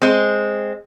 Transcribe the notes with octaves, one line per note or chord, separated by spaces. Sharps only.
G#3 C4